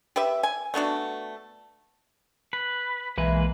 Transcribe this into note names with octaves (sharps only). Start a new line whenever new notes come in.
G4 B4 E5
G#5
A3 B3 D4 F#4
B4
B1 E3 G#3 A#3 B4